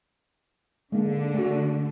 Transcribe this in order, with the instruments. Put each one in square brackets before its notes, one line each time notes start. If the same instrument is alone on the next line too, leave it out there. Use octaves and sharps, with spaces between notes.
[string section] D3 [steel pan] G#3 A#3
[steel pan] A3 F#4